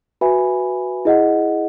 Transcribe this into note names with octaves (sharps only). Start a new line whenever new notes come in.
F#4 B4 E5 G#5 B5
E4 G#4 D#5 F#5